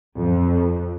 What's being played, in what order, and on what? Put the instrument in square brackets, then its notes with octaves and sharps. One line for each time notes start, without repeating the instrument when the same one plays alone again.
[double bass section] F2